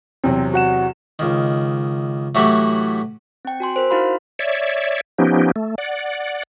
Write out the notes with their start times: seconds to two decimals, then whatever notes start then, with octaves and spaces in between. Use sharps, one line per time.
0.24 E2 C3 F#3 C4
0.54 F#4 F#5 E7
1.19 C#2 D#3
2.35 A2 E3 F#3 A3 F#4 G4
3.45 C4 G5
3.60 F#4 G#5 C6
3.76 A#4 C5
3.90 D#4 E4 F#4 F5 B5 C6
4.39 C#5 D5 E5
5.18 F3 B3 C#4 D#4 G4
5.56 A3
5.78 D5 F#5